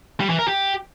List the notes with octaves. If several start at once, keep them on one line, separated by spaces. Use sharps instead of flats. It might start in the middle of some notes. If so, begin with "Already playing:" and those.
G3
E3
A#4
G4